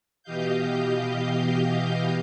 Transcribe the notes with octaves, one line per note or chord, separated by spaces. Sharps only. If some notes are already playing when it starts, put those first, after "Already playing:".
B2 E3 G4 D#5 F5 G6